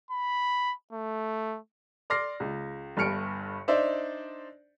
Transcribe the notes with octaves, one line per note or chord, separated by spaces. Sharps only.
B5
A3
D5 C6 D6 F6 A#6 C7
C#2
G1 G2 F6 C#7 D7
D4 D#4 C5 D5 E5